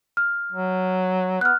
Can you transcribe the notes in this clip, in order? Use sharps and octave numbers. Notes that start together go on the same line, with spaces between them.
F6
F#3
B3 F6 F#6